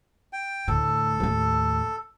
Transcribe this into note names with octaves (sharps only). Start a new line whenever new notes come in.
G5
D2 A2 A4
D#2 A2